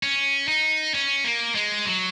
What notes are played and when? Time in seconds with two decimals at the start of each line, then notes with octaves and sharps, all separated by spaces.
0.03 C#4
0.48 D#4
0.94 C#4
1.24 A#3
1.55 G#3
1.85 F#3